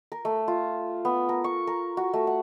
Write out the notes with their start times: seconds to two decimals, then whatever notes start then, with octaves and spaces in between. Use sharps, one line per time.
0.12 A#4
0.25 A3
0.48 F4
1.05 B3
1.29 A#4
1.44 C#6
1.67 A#4
1.97 F#4
2.14 A3
2.27 F#5